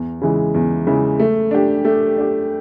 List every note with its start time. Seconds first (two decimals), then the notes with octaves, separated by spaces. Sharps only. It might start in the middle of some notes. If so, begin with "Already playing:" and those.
Already playing: E2
0.21 C#3 E3 G#3
0.54 E2
0.87 C#3 E3 G#3
1.20 A3
1.51 D4 G4
1.85 A3
2.17 D4 G4